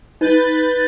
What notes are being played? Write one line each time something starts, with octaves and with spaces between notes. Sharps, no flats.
D#4 B4 G6 A6